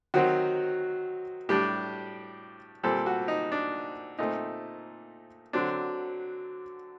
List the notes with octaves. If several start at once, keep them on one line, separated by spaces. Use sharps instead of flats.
D#3 F#3 C4 F#4
A2 G3 D4 G4
A#2 G3 C4 A4
F#4
D#4
D4
A#2 A3 C4 D#4
D3 F#3 C4 D4